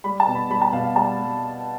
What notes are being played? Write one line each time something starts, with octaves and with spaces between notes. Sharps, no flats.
G3 B5
A5
B2
B5
G3 B5
A5
B2 F5
F5
G3 A5
G3